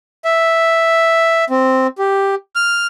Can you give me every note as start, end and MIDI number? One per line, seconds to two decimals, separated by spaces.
0.25 1.45 76
1.50 1.87 60
1.98 2.35 67
2.56 2.87 89